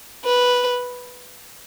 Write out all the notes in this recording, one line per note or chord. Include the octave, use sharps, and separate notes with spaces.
B4